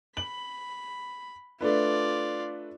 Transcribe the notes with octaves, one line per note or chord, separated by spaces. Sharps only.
B5 F#7
A3 D4 F4 B4 D5